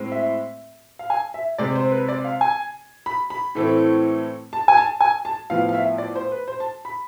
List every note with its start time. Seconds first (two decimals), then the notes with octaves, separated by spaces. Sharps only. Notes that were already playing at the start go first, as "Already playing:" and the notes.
Already playing: A2 G#3 C4
0.12 E5
0.99 F5
1.10 G#5
1.34 E5
1.58 C3 G#3 C4 D5
1.75 C5
1.92 B4
2.08 D5
2.25 F5
2.41 G#5
3.06 B5
3.30 B5
3.55 A2 E3 A3 C4
4.53 A5
4.68 G#5
4.77 A5
5.01 G#5
5.25 A5
5.50 A2 F3 B3 F5
5.69 F5
5.74 E5
5.98 D5
6.15 C5
6.32 B4
6.48 C5
6.60 A5
6.85 B5